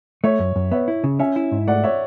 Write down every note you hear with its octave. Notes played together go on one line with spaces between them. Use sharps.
A3 C#5 E5
F#2
F#2
B3 C#5 E5
E4
C#3
C#4 E5 G#5
E4
G#2
A3 D5 F#5
C#5 E5